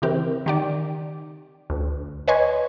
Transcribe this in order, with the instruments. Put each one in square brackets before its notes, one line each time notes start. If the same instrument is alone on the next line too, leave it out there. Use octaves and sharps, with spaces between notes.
[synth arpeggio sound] C#3 E3 C4 G4 A#4
D#3 G4 D5
D2
B4 C#5 D#5 G#5 C6 C#6